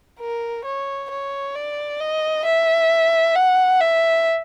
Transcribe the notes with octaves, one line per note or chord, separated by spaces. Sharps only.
A#4
C#5
C#5
D5
D#5
E5
F#5
E5